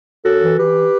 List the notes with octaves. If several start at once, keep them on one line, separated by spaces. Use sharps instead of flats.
F#2 F#4 A4
E3
E3 G4 B4